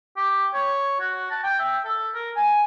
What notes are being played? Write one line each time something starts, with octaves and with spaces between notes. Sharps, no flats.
G4
C#5
F#4
A5
G5
E5
A4
A#4
G#5